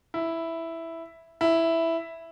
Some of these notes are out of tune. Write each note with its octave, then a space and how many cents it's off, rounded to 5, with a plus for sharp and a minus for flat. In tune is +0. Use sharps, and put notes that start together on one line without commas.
E4 +0
E4 +0